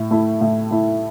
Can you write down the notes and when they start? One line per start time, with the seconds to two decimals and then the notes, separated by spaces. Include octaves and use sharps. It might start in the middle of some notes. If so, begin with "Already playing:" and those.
Already playing: A2
0.11 A3 E4
0.41 A2
0.71 A3 E4